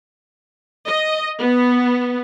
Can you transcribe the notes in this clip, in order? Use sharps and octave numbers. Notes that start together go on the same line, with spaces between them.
D#5
B3